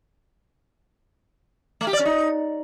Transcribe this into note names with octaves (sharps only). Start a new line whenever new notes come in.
A3
G4
D5
C#4
D#4